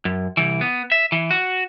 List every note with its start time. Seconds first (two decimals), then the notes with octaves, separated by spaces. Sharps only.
0.05 F#2
0.37 C2 E3
0.61 B3
0.92 E5
1.12 E3
1.31 F#4